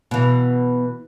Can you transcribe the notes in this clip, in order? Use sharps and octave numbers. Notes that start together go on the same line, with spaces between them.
B2 E3